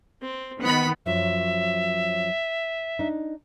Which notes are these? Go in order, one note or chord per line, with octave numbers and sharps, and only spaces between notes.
C4
D#3 B3 F#5 B5
F#2 F3 F#3 E5
D4 D#4